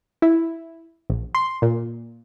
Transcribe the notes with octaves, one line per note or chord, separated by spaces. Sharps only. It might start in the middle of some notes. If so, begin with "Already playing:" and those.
E4
A#1
C6
A#2